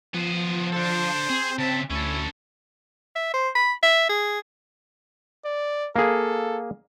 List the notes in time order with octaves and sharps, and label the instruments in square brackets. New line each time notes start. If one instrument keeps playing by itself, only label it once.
[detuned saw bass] F3 [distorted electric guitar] B3 C5
[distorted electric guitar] D4 A4 [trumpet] C5
[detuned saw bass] C4 [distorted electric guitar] G#4
[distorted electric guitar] C#3 E5 [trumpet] A5
[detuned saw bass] D2 [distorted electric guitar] C#4 A4 [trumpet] E4
[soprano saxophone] E5
C5
B5
E5
G#4
[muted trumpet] D5
[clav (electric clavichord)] A#3 G#4 [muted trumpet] A4